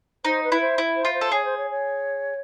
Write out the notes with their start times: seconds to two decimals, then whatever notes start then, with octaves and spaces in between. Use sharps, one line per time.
0.25 D#4 C5
0.43 B4
0.52 E4
0.61 C5
0.78 E4
0.96 C5
1.05 F4
1.14 C5
1.21 A4
1.31 G#4 C#5
1.44 C5
1.57 C#5
1.71 C#5